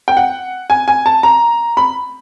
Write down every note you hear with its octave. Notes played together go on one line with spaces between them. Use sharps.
G5
F#5
G#5
G#5
A5
A#5
B5